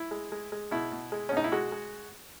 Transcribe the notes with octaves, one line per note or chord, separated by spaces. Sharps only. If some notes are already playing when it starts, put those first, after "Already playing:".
Already playing: E4
G#3
G#3
G#3
B2 E4
B2
G#3
B2 C#4
D#4
E4
G#3 F#4
G#3